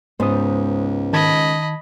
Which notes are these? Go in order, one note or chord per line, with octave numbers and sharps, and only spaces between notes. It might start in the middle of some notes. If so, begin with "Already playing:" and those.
C#2 G#2 B3 D#4 C5 D#6
D#3 D#5 A5 B5 G#6